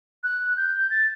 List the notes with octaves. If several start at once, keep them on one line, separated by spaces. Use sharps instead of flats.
F#6
G6
A6